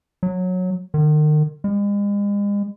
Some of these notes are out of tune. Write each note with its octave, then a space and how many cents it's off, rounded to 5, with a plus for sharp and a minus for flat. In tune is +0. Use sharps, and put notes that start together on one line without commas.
F#3 -15
D#3 -40
G#3 -40